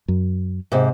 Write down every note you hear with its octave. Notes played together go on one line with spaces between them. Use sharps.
F#2
G#2 C3